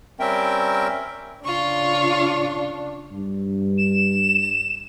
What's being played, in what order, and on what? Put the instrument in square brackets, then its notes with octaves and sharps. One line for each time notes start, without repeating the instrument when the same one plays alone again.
[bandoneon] G3 C4 C#4 A#4 E5 G5
[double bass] C#3 D4 [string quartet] F4 C#6
[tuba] G2
[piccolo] E7